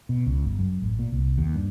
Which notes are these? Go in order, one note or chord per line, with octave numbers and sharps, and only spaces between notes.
B2
C#2
G1
F#2
A1
A#2
C2
D#2
G2